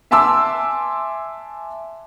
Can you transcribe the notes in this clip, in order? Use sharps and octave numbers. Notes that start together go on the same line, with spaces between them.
E5 G#5 A5 C6 D6 E6